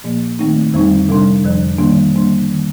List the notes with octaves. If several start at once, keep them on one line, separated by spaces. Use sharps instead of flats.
A#2 F3 A#3
D#3 A3 C4 D#4
F2 D3 G3 C4 D#4
C3 G3 D4
F2 D3 F3
D#3 G3 A#3 D4
D3 G3 A#3 D4
D#3 G3